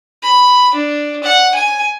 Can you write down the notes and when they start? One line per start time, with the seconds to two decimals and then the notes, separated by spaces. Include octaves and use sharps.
0.22 B5
0.74 D4
1.24 F#5
1.55 G#5